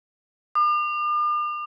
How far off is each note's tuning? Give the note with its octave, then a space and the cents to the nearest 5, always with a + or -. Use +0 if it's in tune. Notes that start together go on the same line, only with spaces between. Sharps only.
D6 +45